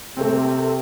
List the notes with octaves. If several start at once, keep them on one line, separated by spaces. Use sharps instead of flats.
C3 A3 A#3 C4